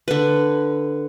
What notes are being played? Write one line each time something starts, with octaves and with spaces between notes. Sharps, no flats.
D3 B4